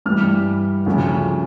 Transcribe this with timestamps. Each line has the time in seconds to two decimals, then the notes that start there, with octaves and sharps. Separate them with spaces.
0.06 G2 E3 G3 F6
0.86 D2 C#3 F3 C#4